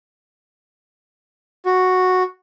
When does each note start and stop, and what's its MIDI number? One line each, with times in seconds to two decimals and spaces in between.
1.66 2.23 66